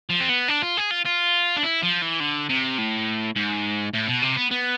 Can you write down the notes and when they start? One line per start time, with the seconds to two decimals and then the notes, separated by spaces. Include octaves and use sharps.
0.10 F3
0.21 C4
0.29 B3
0.48 D4
0.62 F4
0.77 G#4
0.91 F4
1.05 F4
1.56 D4
1.63 E4
1.83 F3
2.02 E3
2.20 D3
2.49 C3
2.78 A2
3.36 G#2
3.93 A2
4.08 B2
4.22 C3
4.36 B3
4.51 B3